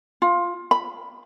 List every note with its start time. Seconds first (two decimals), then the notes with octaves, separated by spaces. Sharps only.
0.22 F4
0.71 B5